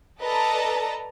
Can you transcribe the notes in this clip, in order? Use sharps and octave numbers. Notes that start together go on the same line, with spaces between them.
A4 B4 D5 D#5 A5 A#5